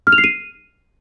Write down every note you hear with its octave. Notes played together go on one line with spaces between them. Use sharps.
F6
F7
C7
D#7